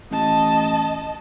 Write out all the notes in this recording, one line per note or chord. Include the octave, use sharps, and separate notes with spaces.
A1 D#5 A5